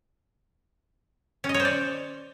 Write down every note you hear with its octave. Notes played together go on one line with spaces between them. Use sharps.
C#4
D#5
C#5
C5
D5